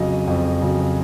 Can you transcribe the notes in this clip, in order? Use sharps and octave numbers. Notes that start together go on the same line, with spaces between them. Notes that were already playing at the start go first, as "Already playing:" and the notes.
Already playing: F2 C#3 F#3 D#5
F2
C#3 F#3